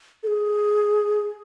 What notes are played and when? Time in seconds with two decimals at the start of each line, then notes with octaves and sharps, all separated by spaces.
0.23 A4
0.27 G#4